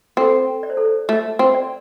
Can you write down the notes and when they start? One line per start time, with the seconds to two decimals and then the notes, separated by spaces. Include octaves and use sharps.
0.17 C4 A4
0.63 D5
0.70 C5
0.77 A4
0.85 C5
1.09 A3
1.39 C4
1.54 D5